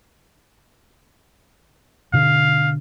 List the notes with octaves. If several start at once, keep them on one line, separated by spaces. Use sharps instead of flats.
B2 D3 F5